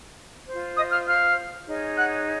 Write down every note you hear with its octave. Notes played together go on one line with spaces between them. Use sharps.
F4 C5
D#5 D#6
F5 F6
F5 F6
D#4 G#4 C#5
F#5 F#6